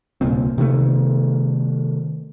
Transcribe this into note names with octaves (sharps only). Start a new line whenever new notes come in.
D1 C2 A#2 C4
C3 D#3 F3 A3